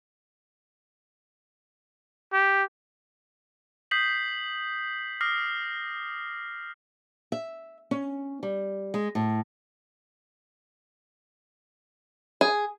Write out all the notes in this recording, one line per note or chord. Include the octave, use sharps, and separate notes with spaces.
G4
D#6 G6 B6 C7 F#7
D6 D#6 F6 A#6 C7
E5
C#4
G3
G#3
A2
G#4